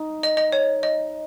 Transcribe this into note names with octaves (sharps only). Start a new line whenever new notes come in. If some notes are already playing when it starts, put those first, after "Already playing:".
Already playing: D#4
D#5
D#5
C#5
D#5